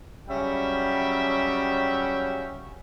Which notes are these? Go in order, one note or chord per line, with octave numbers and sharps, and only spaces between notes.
C#3 F#3 G3 C#4 E5 G5